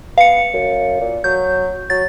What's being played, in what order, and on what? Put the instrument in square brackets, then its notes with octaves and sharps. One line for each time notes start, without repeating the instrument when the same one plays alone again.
[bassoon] B3 [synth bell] F5 C#7
[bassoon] F#2
A#2
[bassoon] F#3 [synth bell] G6
[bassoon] F#3 [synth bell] A6